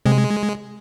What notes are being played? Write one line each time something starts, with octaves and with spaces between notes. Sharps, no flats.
C3 G#3